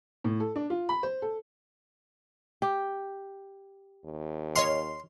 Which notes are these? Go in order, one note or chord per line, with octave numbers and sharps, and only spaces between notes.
A2
A4
D4
F4
B5
C5
A4
G4
D#2
C#5 D#5 C6 F6